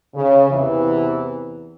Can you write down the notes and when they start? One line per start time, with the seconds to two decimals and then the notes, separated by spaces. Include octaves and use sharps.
0.15 C#3
0.50 E2 C3 E3